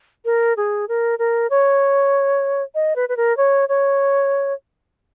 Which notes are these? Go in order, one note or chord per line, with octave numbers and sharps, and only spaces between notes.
A#4
G#4
A#4
A#4
C#5
D#5
B4
B4
A#4
C#5
C#5